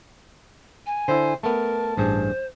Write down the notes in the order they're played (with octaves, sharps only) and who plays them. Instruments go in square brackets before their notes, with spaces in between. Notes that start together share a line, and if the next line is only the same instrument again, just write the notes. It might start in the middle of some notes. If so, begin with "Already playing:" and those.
[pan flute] G#5
[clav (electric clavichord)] D3 E4 [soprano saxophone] C5
[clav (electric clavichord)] A3 B3 [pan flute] A#4 [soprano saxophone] A5
[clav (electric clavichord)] A1 G2 G#4 [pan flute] C5